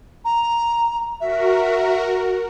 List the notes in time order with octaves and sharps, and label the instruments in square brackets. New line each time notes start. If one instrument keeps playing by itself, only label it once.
[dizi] A#5
[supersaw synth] F#4 A#4 [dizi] E5